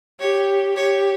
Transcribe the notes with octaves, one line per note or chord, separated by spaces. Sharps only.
G4 C#5
G4 C#5